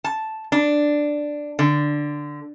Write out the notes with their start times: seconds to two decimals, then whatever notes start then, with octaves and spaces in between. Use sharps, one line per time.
0.04 A5
0.52 D4
1.59 D3